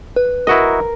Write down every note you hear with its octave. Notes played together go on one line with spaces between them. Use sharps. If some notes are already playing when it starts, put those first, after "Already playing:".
B4
E4 F#4 A#4 D#5